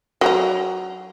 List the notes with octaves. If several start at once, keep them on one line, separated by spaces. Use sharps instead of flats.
F#3 G4 A#5